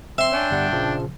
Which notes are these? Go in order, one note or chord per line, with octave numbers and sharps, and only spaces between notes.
C4 E5 C6
D4 C#5 G5 G#5
G1 G3 F#5
A#1 C#3 F3